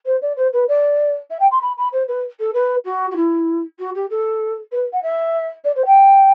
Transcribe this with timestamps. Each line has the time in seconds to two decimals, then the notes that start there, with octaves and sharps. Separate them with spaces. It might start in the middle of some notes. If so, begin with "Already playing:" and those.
0.05 C5
0.22 D5
0.36 C5
0.53 B4
0.68 D5
1.30 E5
1.39 G5
1.51 C6
1.61 B5
1.77 B5
1.92 C5
2.08 B4
2.39 A4
2.54 B4
2.84 F#4
3.11 F#4
3.16 E4
3.79 F#4
3.94 G4
4.10 A4
4.72 B4
4.92 F#5
5.02 E5
5.64 D5
5.76 C5
5.85 G5